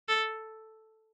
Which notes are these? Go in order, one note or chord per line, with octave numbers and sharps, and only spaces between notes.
A4